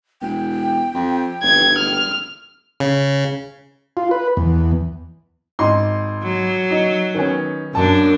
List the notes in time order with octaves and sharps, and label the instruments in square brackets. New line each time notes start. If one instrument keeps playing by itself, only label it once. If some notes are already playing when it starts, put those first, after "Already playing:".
[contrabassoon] E1 [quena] G5
[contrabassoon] F2
[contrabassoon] G1 [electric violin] G#6
[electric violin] F6
[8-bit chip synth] C#3
[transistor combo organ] F4
B4
E2
[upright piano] G#1 D#4 C6
[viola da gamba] F#3
[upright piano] D#4
D#3 B3 C#4
[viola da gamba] F#2 D4 [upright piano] A5